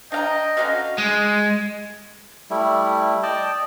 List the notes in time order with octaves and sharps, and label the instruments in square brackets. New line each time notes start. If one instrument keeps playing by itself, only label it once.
[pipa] D4 F5 A#5 [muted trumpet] D#5 [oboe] G5
[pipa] D3 C4 C#4 [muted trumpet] F#4 [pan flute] D#5 [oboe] F5
[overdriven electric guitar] G#3
[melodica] G3 A3 E4
D5 D#5 G5 A5